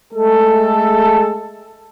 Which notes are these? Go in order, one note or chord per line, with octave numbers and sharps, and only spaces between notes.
G#3 A3 G#4 A4